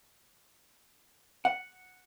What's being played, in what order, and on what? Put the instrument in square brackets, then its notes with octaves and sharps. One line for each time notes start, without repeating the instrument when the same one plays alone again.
[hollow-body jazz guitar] F#5